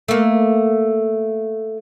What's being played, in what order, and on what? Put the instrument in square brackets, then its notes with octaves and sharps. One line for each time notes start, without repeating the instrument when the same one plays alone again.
[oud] A3 A#3